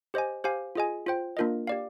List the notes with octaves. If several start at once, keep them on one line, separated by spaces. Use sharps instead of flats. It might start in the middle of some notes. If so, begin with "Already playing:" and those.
G4 C5 D#5 G#5
G4 C5 F5 G#5
F4 G#4 D#5 G#5
F4 C5 G5
A#3 D4 F4 A#4 D#5
G4 D5 F5